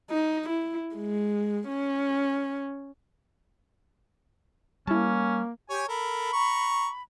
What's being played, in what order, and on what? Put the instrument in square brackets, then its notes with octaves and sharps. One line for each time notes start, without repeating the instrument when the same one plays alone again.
[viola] D#4
E4
G#3
C#4
[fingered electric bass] G3 [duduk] A#3 [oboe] C#4 [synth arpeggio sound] E4 A5
[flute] G4 [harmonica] C#5 G#5
[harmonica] A4 A#4 [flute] B5
[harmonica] A#5 C#6